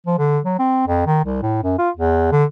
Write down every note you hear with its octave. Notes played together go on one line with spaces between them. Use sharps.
F3
D3
F#3
C4
F2
D#3
C2
A2
F#2
F4
E2
D3